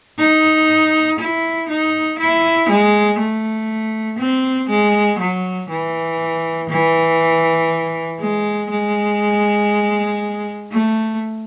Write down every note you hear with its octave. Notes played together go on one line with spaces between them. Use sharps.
D#4
E4
D#4
E4
G#3
A3
C4
G#3
F#3
E3
E3
G#3
G#3
A3